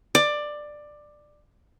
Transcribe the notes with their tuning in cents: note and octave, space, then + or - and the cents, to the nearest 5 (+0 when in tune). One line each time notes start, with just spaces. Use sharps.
D5 +15